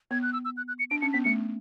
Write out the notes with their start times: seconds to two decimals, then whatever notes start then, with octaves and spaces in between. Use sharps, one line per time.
0.11 B3 G#6
0.23 F#6
0.33 E6
0.45 E6
0.57 F#6
0.68 F#6
0.79 C#7
0.91 D4 D7
1.02 C#4 C#7
1.13 B3 B6
1.24 A3 C#7